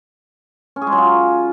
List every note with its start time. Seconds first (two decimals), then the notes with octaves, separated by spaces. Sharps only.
0.76 C#4
0.82 G#4
0.87 G#3
0.92 F#3
0.98 F4